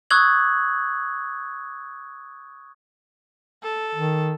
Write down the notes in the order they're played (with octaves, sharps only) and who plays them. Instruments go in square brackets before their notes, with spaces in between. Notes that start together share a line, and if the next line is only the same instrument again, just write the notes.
[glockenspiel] C#6 D#6 E6 F#6 G#6 F#7
[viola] A4
[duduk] D#3